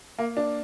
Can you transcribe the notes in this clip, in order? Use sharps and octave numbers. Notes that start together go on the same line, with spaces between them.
A#3
D4